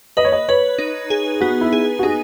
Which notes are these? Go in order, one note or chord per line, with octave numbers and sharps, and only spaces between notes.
B4 D#5
C#5
D#5
B4 C#5
D#4
G#4
B3 F#4
E4
G#4
F#4
D#4 G#4